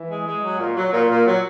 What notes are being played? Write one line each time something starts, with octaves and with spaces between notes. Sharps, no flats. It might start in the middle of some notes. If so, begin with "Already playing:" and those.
Already playing: E3
G#3
G#3
F#3
A#2
F#3
A#2
A#2
F#3